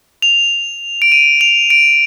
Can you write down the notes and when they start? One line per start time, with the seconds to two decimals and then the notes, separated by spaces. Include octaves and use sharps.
0.22 F7
1.02 D7
1.12 D#7
1.41 F7
1.70 D7